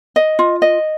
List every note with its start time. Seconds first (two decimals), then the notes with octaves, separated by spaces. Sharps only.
0.16 D#5
0.39 F4
0.62 D#5